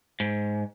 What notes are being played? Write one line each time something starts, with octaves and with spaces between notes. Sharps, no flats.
G#2